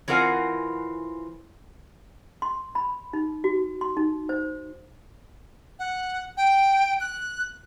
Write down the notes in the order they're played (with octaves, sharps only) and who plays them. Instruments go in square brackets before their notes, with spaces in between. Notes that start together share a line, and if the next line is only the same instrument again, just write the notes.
[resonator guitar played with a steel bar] E3 C4 F4 A#4 F#5 G#5
[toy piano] C6
B5
D#4
F#4
C6
D#4
C5
[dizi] F#5
G5
F#6